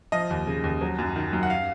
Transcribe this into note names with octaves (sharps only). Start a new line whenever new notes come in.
F3 D#5
D#2
C#3
D#2
F#3
F#2
D#3
F#2
F#5
F5